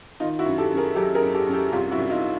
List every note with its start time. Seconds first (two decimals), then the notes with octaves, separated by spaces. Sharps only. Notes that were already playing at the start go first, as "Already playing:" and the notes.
0.20 D#3 D#4 F4
0.39 E4 F#4
0.46 F#2
0.58 G4 A4
0.71 F#2
0.77 G#4 A#4
0.96 F#3 G4 A4
1.15 G#4 A#4
1.22 F#2
1.34 G4 A4
1.46 F#2
1.53 G4 A4
1.72 C2 F4 G4
1.91 E4 F#4
1.98 C2
2.10 D#4 F4